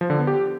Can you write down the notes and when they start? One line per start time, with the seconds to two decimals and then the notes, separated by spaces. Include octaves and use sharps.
0.01 F3
0.10 D3
0.19 B3
0.27 G4